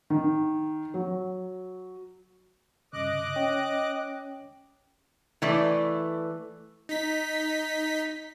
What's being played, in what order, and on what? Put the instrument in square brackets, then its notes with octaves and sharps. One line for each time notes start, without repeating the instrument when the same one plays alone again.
[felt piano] D#3
F#3
[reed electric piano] G2 C#3 [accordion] D#5 D6 F#6
[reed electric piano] C#4 C#5 G5
[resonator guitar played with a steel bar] E3 A3 D5
[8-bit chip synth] D#4 B6